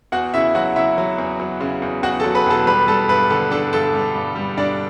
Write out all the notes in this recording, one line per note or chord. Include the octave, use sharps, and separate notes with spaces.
E2 F#4 F#5
C#3 E4 E5
F#3 F#4 F#5
C#3 E4 E5
F#3
E2
F#3
C#3
E2
E2 F#4 F#5
F#3 A4 A5
B4 B5
E1 A4 A5
G3 B4 B5
G3 A4 A5
G2 B4 B5
D3 A4 A5
D4 A4 A5
G2 A4 A5
G3
G2
G3
G2 D4 D5